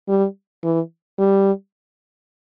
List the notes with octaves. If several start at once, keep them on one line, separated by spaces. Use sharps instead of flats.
G3
E3
G3